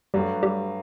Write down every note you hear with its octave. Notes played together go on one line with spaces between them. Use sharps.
G2 F#3 G3 A3
G3